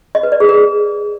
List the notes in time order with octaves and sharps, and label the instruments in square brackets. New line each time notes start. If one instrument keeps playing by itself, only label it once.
[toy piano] D#5
B4
D5
G#4
A#4